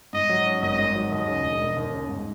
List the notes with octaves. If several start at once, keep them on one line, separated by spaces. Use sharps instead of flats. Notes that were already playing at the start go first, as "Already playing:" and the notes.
G#2 D#5
F#3
C#4
G#1 D#5
G#2
F#3
D#2 D#5
C#3
E1
E1
D#2
C#3
G#2